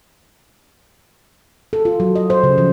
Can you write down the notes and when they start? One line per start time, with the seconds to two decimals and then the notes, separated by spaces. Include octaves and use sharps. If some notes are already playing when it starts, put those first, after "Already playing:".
1.73 A4
1.85 F4
2.00 F#3
2.16 D#5
2.30 C5
2.44 C#3
2.58 F3